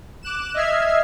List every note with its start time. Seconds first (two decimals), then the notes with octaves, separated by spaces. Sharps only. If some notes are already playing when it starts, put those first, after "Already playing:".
0.23 D6 F#6 E7
0.54 D#5 E5 F6 G#6 C7